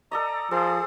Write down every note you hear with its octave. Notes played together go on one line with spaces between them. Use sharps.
A4 D5 D#5 A#5
F3 G#4 A4 C5